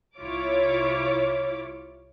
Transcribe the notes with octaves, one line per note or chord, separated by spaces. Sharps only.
C2 E4 F4 C#5 D6